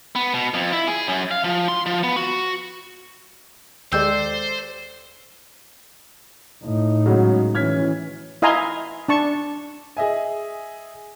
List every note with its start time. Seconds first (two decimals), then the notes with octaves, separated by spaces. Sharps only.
0.16 B3
0.34 B2
0.54 F2
0.73 E4
0.87 G#4
1.07 F#2
1.31 F5
1.44 F3
1.68 C6
1.86 F3
2.03 B3
2.16 F#4
3.92 D#2 G#3 G4 A4 C5 D5 E6 G6
6.63 A2 D#4
7.06 G#2 C#3 F#3
7.55 E3 C#4 F6 G#6 B6
8.42 E4 D#5 F5 G#5 A#5 C6
9.09 D4 A5 C#6
9.97 G#4 D#5 E5 G#5